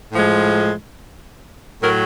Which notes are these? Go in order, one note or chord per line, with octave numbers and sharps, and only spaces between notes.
A2 F3 G#3
A2 F#3 A3 A#4